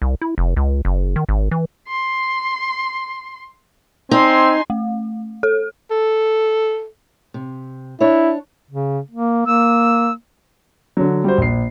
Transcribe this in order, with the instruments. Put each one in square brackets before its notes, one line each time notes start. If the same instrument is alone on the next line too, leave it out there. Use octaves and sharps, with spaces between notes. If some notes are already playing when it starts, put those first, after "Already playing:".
[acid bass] C2
E4
F1
C#2
F#1
D#3
G#1
E3
[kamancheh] C6
[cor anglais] C4 [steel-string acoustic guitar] D#4 [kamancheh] G#5 C6
[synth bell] A3
A4
[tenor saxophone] A4
[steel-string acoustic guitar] C3
[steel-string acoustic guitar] D4 C#5 [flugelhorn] E4
[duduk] C#3
A#3
[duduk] A#3 [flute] E6
[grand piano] D3 F#3
G3 F#4 C5
A#1 C7